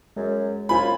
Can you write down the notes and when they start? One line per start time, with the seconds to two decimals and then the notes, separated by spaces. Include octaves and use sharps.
0.16 F#2 G#3
0.69 F#2 F4 C5 G#5 B5